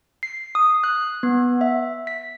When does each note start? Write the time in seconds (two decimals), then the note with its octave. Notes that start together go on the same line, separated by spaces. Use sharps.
0.23 C7
0.55 D#6
0.84 F#6
1.23 B3
1.61 E5
2.07 B6